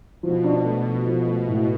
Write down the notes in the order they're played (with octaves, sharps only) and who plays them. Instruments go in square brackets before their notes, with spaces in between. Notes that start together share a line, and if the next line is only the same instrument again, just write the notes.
[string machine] B2 [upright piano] F3
[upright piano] D4
A3
F3
[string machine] B2 [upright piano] F3
[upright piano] A3
A2